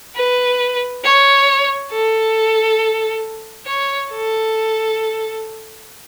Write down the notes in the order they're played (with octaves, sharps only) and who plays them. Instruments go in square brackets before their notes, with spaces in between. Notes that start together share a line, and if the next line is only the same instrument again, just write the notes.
[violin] B4
C#5
A4
C#5
A4